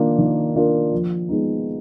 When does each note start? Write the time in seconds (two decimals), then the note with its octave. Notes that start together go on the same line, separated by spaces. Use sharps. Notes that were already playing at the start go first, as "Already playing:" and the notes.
Already playing: D#3 A#3 D4 F4 A#4
0.18 D#3
0.56 A#3 D4 F4 A#4
0.92 F3
1.29 G#3 B3 D#4